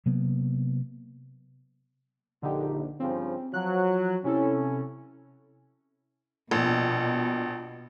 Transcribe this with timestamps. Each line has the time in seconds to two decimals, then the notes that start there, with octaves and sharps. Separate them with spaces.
0.06 C3 F#3 A#3 B3
2.43 A#1 D3 D#4 G4
3.00 G2 C#3 F3 C4
3.54 F3 F#3 F#6
4.24 C3 C#4 E4 A4
6.51 A#1 B2